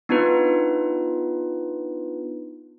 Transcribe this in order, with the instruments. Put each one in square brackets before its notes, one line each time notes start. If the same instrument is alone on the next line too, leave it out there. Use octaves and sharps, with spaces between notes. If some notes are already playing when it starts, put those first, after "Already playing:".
[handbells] B3 D4 D#4 F4 B4